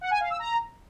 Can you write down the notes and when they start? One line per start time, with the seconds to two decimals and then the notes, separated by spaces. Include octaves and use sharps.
0.01 F#5
0.11 G#5
0.20 F5
0.30 E6
0.39 A#5